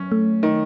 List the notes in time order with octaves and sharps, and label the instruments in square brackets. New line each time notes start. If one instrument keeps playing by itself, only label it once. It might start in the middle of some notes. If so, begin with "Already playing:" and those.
Already playing: [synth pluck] F#3 [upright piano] C#4
[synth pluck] A3
[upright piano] D#3